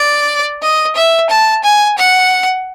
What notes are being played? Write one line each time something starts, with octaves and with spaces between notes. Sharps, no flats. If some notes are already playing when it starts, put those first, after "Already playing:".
Already playing: D5
D#5
E5
A5
G#5
F#5